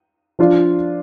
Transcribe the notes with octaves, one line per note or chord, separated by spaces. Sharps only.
F3 D4 F4